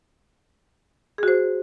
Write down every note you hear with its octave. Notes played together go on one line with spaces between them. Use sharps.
F#4 G#4 C5